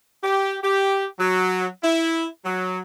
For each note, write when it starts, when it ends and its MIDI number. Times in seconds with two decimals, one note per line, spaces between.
0.24 0.58 67
0.63 1.06 67
1.19 1.67 54
1.83 2.25 64
2.45 2.80 54